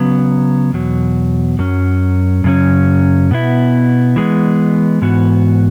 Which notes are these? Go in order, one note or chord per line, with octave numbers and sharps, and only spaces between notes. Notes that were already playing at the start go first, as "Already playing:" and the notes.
Already playing: C#3 F#3 B3
E2 B2 F#3
F#2 F#3 C#4
F#2 C#3 F#3 C#4
B2 B3 E4
E3 G#3 B3
G#2 E3 B3 F#4